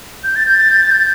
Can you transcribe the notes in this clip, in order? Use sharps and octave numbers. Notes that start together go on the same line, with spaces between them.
G6
A6
G6
A6
G6
A6
G6